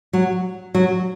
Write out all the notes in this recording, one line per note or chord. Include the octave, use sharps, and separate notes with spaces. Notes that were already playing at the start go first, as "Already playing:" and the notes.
F#3
F#3